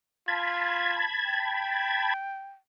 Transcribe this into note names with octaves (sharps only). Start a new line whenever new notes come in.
F4 A5 B5 G#6
G5